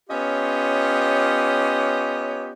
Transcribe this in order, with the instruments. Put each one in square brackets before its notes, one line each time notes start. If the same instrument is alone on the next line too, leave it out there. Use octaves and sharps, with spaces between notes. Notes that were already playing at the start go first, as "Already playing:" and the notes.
[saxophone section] B3 C#4 F4 G4 C#5 D#5